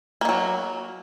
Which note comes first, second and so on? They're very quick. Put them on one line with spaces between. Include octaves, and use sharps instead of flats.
A#3 D#3 F#3